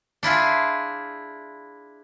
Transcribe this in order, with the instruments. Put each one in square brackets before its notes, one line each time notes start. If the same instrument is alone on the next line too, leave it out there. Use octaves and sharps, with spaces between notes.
[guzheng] D4 E4 F4 G#4